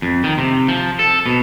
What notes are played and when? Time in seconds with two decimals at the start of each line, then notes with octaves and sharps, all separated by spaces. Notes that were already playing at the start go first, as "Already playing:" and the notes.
0.02 F2
0.24 D#3
0.38 C3
0.68 F3
0.99 A4
1.26 B2